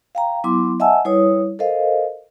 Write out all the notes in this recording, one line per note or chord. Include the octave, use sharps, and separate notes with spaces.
F5 G5 A#5
F#3 B3 E4 C6 D6
D#5 E5 F#5 G#5 A5 E6
G3 E4 B4 C#5 D#6
A4 A#4 C5 D#5 F5